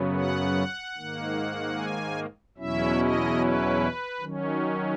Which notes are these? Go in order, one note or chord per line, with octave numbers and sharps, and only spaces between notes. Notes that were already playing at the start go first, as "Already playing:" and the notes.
Already playing: F#2 C#3 F#3 B3
F#5
G#2 D#3 A#3
G#5
E2 B2 F#3 C#4 E4 E5
D#5
B4
D#3 F#3 C#4